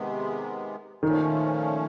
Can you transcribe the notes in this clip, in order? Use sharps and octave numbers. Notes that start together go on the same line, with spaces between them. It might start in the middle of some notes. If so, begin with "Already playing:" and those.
Already playing: C3 D#3 G#3 B3
A#2 D#3 F3 A3 C#4